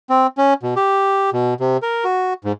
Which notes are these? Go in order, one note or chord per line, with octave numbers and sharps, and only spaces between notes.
C4
C#4
B2
G4
B2
C3
A#4
F#4
G#2